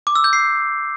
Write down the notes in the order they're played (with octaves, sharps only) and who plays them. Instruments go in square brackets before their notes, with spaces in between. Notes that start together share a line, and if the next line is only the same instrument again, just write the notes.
[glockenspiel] D6
E6
G6
C7